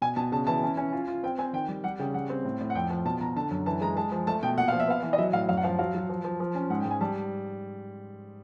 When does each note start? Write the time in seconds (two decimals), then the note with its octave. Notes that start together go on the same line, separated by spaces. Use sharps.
0.02 B2 G#5
0.16 B2 A5
0.32 C#3 A5
0.47 E3 A5
0.63 C#4
0.77 C#4
0.92 F4
1.08 F4
1.23 C4 G5
1.38 C4 G#5
1.53 D#3 G5
1.68 G3
1.84 G3 F#5
1.99 C#3 G5
2.14 G3 F#5
2.30 C4
2.45 A2
2.60 A2
2.70 F#5
2.75 F2 G5
2.90 F3
3.05 B2 A5
3.21 B2 A#5
3.36 D3 A5
3.51 F#2
3.66 E3 A5
3.81 G#3 A#5
3.96 G#3 A5
4.12 F3
4.27 A3 A5
4.43 B2 G5
4.57 A#2 F#5
4.68 F3 F5
4.80 E5
4.88 B3 F5
5.03 E3
5.13 D#5
5.18 F#3 E5
5.33 A2 F5
5.49 F#2 F5
5.57 F#5
5.64 F3 F5
5.79 F#3 F5
5.95 F#3
6.09 F3
6.25 F3
6.40 F3
6.55 C#4
6.70 G#2 F#5
6.80 G5
6.85 G#2
6.91 G#5
7.01 G3 A5